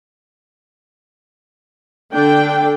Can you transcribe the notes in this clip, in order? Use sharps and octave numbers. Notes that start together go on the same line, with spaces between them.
D3 D4 A4 G5